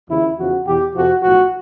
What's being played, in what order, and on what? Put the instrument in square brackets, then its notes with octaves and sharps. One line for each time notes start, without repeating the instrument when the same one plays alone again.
[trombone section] D#2 C#3 F3 E4
E2 C#3 F3 F#4
E2 B2 G4
F2 C3 F3 F#4
B1 A2 F3 F#4